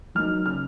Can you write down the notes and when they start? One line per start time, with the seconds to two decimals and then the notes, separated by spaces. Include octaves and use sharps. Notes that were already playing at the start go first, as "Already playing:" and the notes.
0.15 F#3 A#3 D#4 F6
0.46 C#3 F6